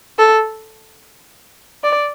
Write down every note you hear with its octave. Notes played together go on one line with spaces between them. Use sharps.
A4
D5